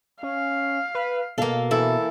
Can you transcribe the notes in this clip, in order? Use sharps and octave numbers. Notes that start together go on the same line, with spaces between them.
C#4 F5
B4
B2 A#3 A4 F5
E3 E4 A4